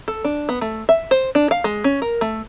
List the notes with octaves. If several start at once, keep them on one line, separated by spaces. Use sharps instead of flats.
A4
D4
B3
A3
E5
C5
D4
F5
G#3
C#4
A#4
A3